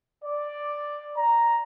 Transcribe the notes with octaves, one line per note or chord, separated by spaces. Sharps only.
D5
A#5